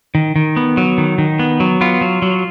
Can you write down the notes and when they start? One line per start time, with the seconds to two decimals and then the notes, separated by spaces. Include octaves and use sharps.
0.15 D#3
0.36 D#3
0.56 B3
0.77 F#3
0.98 D#3
1.18 D#3
1.39 B3
1.60 F#3
1.81 B3 F4
2.01 F#3
2.22 F#3